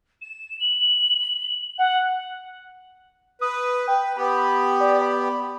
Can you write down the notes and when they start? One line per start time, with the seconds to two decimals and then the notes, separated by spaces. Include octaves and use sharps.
0.22 E7
0.60 F#7
1.78 F#5
3.41 B4 D#6
3.88 B4 G5
4.17 B3 G4 B5
4.80 D5
5.02 B5